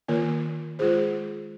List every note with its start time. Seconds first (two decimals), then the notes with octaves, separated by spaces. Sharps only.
0.08 D#3 A#3 F4 A#4
0.79 G#3 F4 G#4 C5